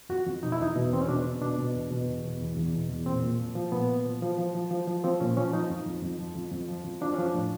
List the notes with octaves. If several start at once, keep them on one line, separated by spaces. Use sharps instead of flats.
F2 F#4
F2
B2 D#4
E4
E2 D#4
B2
E2 C4
C#4
B2 D4
B2
B2 D4
B2
E2
B2
E2
B2
E2
E2
B2
E2
A#2 C4
A#2
F3
F3
A#2 B3
A#2
F3
F3
F3
F3
F3
F3
F3 C4
A#2 C#4
F3 C#4
F3 D#4
F2
F2
F2
F3
F2
F2
F3
F2
F3 D4
F3 C#4
D4
A2